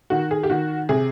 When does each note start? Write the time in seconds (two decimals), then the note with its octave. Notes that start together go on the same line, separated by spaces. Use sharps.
0.10 D#3 F#4
0.31 G#4
0.43 G4
0.50 D#3 F#4
0.89 C3 G#4